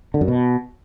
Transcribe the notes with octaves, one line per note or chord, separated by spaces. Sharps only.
D3
F#2
B2